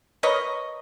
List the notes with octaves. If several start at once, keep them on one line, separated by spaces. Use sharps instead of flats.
A#4 B4 C#5 D#5